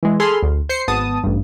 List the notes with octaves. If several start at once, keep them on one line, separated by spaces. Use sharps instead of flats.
E3 G#3
G#4 A4 B5 C6 F6
D2
C5 C7 C#7
G#1 B3 A5 D#6
A1 G2